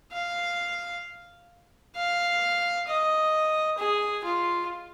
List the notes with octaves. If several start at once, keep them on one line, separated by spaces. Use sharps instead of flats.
F5
F5
D#5
G#4
F4